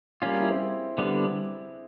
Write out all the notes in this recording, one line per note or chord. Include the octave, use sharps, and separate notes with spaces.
G3 A#3 C#4 F4
G#4
E4
C4
D3 G3 B3 D4